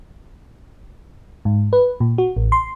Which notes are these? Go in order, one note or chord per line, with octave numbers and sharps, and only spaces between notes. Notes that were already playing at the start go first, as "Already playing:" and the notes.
G#2
B4
A#2
F#4
A1
C6